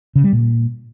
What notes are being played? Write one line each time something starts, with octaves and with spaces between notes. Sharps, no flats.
C#3
G3
A#2